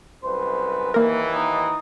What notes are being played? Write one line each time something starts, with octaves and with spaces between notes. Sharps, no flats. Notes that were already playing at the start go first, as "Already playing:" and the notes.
C2 F#2 B4 C5
D#2 E3 A#3 A#4
D#4